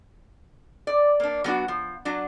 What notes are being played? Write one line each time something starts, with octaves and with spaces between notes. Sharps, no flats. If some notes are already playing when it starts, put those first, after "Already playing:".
D5
A#3 D4
F#3 B3 D4 F#4
F3
F#3 D4